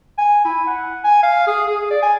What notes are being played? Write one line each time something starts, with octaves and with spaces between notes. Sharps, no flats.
G#5
E4
F#5
G#5
F5
G#4
G#4
D5
G#5